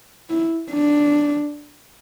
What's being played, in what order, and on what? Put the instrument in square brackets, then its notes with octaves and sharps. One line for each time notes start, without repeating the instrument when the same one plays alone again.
[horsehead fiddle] E4
D4